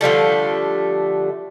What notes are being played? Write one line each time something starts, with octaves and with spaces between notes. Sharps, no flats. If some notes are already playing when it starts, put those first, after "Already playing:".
D3 F3 G3 A3